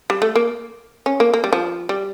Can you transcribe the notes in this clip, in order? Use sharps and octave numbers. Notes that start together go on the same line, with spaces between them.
G3
A3
A#3
C#4
A#3
A#3
G3
F3
G3